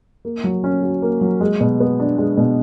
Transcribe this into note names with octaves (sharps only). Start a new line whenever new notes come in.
A#3
F#3
C#4
F#4
A#3
F#3
G#3
B2
B3
D4
G#3
B2